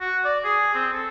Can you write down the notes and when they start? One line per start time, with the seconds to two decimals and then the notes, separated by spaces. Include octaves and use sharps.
0.01 F#4
0.25 D5
0.45 G#4
0.75 C4
0.93 A4